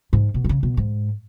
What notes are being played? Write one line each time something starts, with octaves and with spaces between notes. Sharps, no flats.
G#2
B2
D#3
C#3
B2
G#2